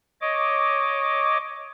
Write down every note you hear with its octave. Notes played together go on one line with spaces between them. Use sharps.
C#5 D#5 D6